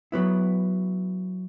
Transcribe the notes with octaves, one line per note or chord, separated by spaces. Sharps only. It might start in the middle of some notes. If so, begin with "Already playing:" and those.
F#3 B3 E4